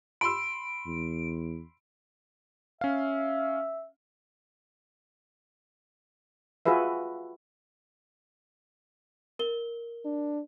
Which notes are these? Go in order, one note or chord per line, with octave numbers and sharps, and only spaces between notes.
B5 C6 E6 D7
E2
C#4 E5 F5
F4 F#4 G#4 B4 E5
A#4 G7
D4